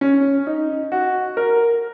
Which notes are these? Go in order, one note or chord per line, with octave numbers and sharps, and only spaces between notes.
C#4
D#4
F#4
A#4